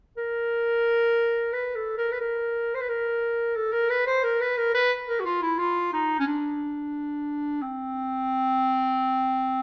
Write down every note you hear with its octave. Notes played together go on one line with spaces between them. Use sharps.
A#4
B4
A4
A#4
B4
A#4
C5
B4
A#4
A4
A#4
B4
C5
A#4
B4
A#4
B4
A#4
F#4
F4
E4
F4
D#4
C#4
D4
C4